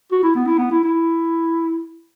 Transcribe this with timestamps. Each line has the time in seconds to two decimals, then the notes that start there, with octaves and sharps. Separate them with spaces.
0.11 F#4
0.23 E4
0.35 B3
0.47 E4
0.58 B3
0.71 E4
0.83 E4